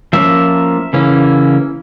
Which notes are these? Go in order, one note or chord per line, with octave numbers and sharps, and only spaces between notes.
F3 A#3 C#4 E5
C#3 E3 A#3 C#4